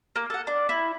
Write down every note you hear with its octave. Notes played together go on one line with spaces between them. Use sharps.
A#3
A4 F#5
D4
E4